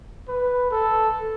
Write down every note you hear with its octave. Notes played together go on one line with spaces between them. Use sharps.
B4
A4